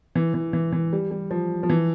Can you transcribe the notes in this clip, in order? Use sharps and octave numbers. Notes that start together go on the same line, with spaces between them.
E3
E3
E3
E3
G3
G3
F3
F3
E3